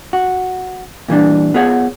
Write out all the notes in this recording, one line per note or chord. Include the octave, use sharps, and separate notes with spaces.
F#4
A#2 E3 G3 D4
B3 F4 G#4 C#5 E5 F#5